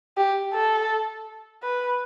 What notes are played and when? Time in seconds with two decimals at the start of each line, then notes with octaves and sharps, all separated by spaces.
0.17 G4
0.53 A4
1.63 B4